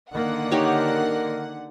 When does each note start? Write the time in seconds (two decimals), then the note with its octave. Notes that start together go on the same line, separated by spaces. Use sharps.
0.12 D3 D#3 A#3 F#5
0.52 D#4 G4 A#4 C#5